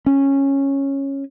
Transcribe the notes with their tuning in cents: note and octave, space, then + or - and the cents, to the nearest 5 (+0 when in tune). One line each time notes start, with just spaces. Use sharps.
C#4 -10